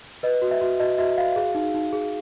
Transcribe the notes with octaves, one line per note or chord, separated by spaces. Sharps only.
B4 D#5
F#4
E5
F#4
F#4 D#5
F#4 E5
F#4 F5
G#4
D#4
D#4
G#4